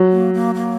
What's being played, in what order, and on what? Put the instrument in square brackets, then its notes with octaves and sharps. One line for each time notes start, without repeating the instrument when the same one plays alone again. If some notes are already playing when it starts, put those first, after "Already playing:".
Already playing: [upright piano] F#3
[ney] A#3
A#3
A#3